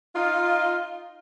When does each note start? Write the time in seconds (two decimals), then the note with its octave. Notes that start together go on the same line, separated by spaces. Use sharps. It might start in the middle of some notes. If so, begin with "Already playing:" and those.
0.14 D#4 F4